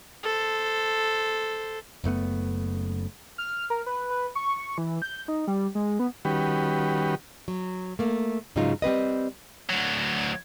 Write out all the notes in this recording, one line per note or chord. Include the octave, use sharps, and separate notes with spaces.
A4 C5
F#1 F#2 A3 B3
F6
A#4
B4
B4
C#6
E3
G6
D#4
G3
G#3
B3
D#3 G3 C#4 F#4 G4 B4
F#3
A3 A#3
G#2 C#3 F#3 G#3 D#4 F4
G3 C4 B4 D#5
D2 F#3